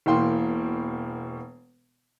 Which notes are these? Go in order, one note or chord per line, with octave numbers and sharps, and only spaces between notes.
E1 B2 E3 A#3 G5 C6